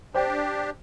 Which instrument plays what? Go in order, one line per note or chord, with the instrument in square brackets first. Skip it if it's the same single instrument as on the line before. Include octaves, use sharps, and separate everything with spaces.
[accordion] D4 G4 [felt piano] C5 G5